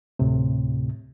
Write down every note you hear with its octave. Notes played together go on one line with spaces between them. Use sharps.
D2 A2 C3